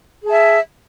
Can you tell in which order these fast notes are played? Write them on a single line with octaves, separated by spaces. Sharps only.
G#4 A5 E5